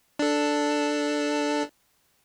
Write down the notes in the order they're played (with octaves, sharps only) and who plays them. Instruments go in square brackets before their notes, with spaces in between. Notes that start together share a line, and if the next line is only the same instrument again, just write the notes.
[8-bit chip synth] D4 A4